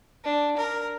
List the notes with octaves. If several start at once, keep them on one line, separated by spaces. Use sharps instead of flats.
D4
A#4